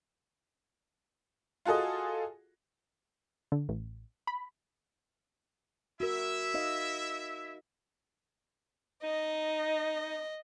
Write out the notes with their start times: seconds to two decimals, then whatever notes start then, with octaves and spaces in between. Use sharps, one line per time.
1.65 F4 F#4 G#4 A4 D#5
3.52 D3
3.69 A1
4.27 B5
6.00 E4 F#4 A#4 E5
6.54 D#4 D#5 F5
9.03 D#4 D#5